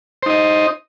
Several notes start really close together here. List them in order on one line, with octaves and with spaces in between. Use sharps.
C5 D#4 D#5